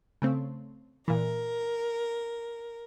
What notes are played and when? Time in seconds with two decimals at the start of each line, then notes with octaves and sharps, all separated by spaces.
0.22 C#3 A3 C4
1.08 A#2 E3 A#4